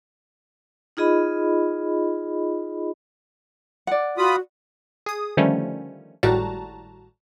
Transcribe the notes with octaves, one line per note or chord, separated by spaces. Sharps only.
D#4 F4 G#4 D#5 B5
D5 F#5
F4 F#4 B5 D#6
G#4 D#6
D3 D#3 F3 G3 A3 C#4
G#1 A2 G3 F#4 A5 A#5